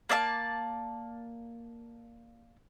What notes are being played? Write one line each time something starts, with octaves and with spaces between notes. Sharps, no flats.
A#3 D5 E5 A5